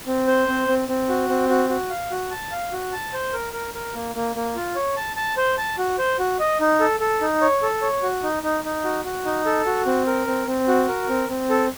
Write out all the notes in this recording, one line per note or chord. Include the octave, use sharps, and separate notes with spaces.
C4
C5
C4
C4
C4
F#4
C4
F#4
F#4
F5
F#4
A5
F5
F#4
A5
C5
A#4
A#4
A#4
A#3
A#3
A#3
F4
C#5
A5
A5
C5
A5
F#4
C5
F#4
D#5
D#4
A4
A4
D#4
C#5
A4
C#5
F#4
D#4
D#4
D#4
F#4
F#4
D#4
A4
F#4
C4
A#4
C4
C4
F#4
A#4
C4
C4
A4